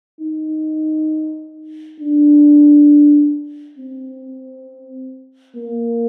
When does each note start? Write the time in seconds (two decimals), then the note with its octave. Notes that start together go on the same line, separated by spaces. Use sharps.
0.21 D#4
2.00 D4
3.78 C4
5.57 A#3